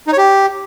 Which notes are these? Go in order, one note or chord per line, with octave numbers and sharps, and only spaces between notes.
D#4
C#5
G4